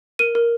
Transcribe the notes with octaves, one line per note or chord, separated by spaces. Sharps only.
A#4 D#7
A#4